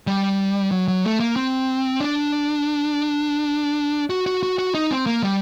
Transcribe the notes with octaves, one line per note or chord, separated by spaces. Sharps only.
G3
F#3
F#3
A3
A#3
C4
D4
F#4
F#4
F#4
F#4
D#4
C4
A#3
G3